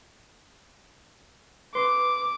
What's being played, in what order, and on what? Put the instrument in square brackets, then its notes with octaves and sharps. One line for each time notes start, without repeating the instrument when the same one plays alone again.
[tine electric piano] B4 C6 [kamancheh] D6